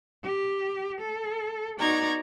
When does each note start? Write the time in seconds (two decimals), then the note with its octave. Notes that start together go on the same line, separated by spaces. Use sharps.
0.24 G4
1.01 A4
1.79 B3 D#4 F#4 D5 A#5 G#6